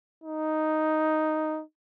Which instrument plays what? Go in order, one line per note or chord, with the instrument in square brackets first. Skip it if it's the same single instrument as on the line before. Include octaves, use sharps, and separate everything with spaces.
[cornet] D#4